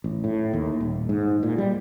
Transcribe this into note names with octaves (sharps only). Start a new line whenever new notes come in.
A1
A2
D#2
D#1
G#2
A#2
G3